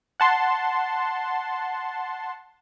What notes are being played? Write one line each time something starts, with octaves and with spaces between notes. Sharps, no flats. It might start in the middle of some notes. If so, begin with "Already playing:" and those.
F#5 A5 C6